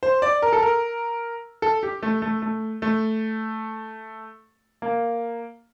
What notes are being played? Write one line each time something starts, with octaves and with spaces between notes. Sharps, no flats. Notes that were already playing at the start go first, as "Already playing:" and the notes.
C5
D5
A#4
A4
A#4
A4
G4
A3
A3
A3
A3
A#3